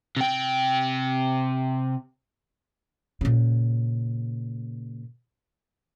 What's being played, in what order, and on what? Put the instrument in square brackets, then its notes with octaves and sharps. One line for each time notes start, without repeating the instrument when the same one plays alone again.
[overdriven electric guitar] C3 G5
[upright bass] A#2 C#3